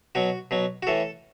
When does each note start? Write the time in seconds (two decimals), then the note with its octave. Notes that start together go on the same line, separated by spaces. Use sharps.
0.15 B2 F#3 F#4
0.51 B2 F#3
0.83 F#4
0.87 A2 E3 A4